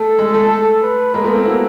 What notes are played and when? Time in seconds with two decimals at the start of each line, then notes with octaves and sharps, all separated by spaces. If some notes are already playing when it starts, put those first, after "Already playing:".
Already playing: A3 A4
0.19 G#3
0.34 A3
0.82 B4
1.14 G#3 A#3 A#4
1.24 A3 B3
1.35 A#3 C4
1.45 E4 F#4